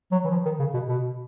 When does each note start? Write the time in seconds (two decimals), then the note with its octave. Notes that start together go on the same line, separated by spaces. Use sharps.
0.12 F#3
0.24 E3
0.31 F3
0.45 D#3
0.59 C#3
0.74 B2
0.88 B2